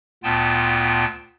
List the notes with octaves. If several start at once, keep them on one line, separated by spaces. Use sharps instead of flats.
D2 A#2 B3 F4 G5 A5